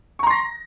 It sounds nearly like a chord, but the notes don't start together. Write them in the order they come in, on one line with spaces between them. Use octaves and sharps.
C#6 A#5 C6 A#6